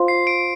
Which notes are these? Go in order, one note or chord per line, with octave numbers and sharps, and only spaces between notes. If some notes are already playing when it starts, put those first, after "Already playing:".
Already playing: F4 C5 F5 C6
C7
D7